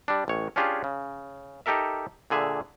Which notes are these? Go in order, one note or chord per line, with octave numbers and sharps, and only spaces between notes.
G3 D4
A1 C#5
C#4 D4 F4 G4 G#4
C#3
D#4 G4 A4 A#4 E5
A#2 D3 G#4 E5